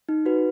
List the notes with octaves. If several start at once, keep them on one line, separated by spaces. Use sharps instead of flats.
D#4
F#4 B4